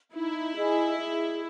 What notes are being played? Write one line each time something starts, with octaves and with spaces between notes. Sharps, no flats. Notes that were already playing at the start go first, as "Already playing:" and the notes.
D#4 E4
G#4 D#5 G#5
G#4